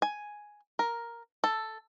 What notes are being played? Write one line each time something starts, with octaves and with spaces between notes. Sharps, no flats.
G#5
A#4
A4